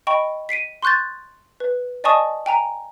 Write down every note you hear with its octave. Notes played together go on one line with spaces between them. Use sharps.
D#5 G5 B5 C#6
B6 C7 D7 D#7
C6 C#6 F#6 G6 A6
B4
D5 D#5 G#5 A5 C#6 D#6
G5 G#5 A#5